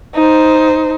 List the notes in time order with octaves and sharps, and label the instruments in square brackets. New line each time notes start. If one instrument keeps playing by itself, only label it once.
[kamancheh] D#4 C5